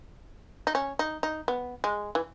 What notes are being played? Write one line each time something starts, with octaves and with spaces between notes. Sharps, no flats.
D#4
C#4
D#4
D#4
B3
G#3
E3